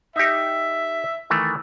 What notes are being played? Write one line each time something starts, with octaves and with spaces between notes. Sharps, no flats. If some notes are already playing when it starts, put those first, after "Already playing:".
D#4 G4 E5
D#3 E3 A3